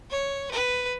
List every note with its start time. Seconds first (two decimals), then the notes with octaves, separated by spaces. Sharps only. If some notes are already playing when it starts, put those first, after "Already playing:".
0.10 C#5
0.52 B4